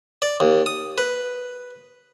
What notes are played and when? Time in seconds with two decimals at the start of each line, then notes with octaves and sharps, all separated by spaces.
0.22 D5
0.40 D#2
0.66 D#6
0.98 B4